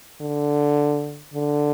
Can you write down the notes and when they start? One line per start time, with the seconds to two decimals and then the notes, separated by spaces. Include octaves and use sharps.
0.21 D3
1.34 D3